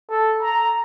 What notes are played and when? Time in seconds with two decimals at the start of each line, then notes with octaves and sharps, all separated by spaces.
0.10 A4
0.43 A#5